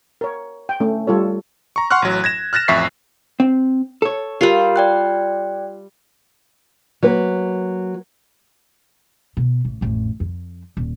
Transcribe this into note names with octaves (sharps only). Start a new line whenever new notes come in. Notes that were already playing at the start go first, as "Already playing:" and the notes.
A#4 C#5
G5
A3 C#4
G3 F4 A4 C#5
A#5 C#6
F#5 C6 C#6 F6 F#6
A1 F#3
G#6 A#6 E7
F6 F#6 A6 A#6 E7
A1 F2 E5 C#6 B6 C7
C4
A4 C#5
G3 F4 G4 A#4
D5 G5 F#6
F#3 A#3 B4
B2
A1
A1 F2
F2
D#1